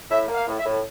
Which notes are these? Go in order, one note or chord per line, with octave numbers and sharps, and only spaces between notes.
A2 E5
A#3
F5
A2
E5
A2